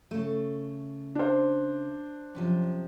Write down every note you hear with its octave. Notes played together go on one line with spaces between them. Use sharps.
C#3 A3
D4 C5
F#2 C3 F3